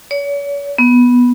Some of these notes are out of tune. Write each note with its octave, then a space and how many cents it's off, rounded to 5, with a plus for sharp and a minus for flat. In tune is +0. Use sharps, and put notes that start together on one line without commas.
C#5 +40
B3 -10